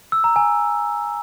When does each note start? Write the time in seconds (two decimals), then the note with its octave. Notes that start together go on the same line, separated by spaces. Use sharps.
0.12 E6
0.24 A#5
0.36 G#5